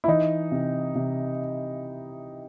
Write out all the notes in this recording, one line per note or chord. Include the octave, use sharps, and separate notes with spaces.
E4
E3 D#4
C3
C3